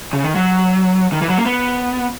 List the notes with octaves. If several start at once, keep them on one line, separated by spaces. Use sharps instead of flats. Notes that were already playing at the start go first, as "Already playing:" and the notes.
C#3
D#3
F#3
D#3
E3
F#3
A#3
B3